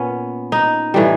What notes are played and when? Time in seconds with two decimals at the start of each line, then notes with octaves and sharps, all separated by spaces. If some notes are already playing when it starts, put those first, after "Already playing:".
Already playing: A#2 B3 C#4
0.52 D#4
0.94 A2 E3 G3